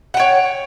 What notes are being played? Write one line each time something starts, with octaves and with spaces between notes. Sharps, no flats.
C#5 F#5 G5